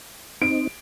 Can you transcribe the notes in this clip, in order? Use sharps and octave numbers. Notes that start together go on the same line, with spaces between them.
C4 D#4 D7